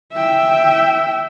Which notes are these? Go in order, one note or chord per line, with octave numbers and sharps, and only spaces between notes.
E5 G5